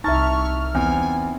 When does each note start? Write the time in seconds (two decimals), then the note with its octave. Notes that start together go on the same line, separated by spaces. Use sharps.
0.04 C2 D#4 E5 A5 A#5 C#6 F6 A6
0.75 E2 C4 G#5